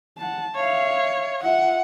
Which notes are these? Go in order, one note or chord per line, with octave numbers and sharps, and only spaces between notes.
F#5 A5
C#5 E5 F5
F4 E5 F#5